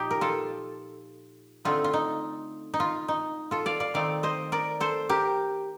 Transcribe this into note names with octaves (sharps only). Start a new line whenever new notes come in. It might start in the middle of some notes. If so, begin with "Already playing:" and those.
Already playing: A#2 F3 D#4 G4
A#4
F4 A4
D3 A3 C4 D#4 F4
F4
D#4
D#4
F4
D#4
F4 A4
D5 F5
D5 F5
D#3 A3 C4 D#4 D5 F5
C5 D#5
A#4 D5
A4 C5
G4 A#4